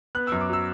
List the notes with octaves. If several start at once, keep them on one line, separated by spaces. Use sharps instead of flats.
B3 F#6
F#2 E6
D6
F#3 E6